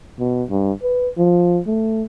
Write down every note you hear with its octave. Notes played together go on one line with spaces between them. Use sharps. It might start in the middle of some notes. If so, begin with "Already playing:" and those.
B2
G2
B4
F3
A3